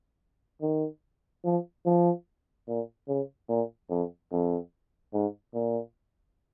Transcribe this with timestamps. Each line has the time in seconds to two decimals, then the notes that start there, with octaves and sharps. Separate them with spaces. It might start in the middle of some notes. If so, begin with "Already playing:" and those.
0.61 D#3
1.45 F3
1.85 F3
2.68 A#2
3.08 C#3
3.49 A#2
3.90 F2
4.32 F2
5.13 G#2
5.54 A#2